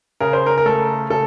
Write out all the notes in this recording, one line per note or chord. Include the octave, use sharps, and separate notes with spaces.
C#3 A#4
C5
A#4
A#4
A3 A4
C#3 A4